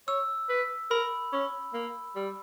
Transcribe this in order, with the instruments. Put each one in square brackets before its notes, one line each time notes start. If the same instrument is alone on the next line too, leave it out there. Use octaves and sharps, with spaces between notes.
[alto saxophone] C#5 [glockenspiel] E6
[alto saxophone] B4
[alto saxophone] A#4 [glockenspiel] B5
[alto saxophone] C#4
A#3
G3